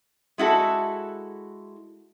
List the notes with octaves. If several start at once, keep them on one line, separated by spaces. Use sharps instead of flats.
G#3 E4 F#4 A4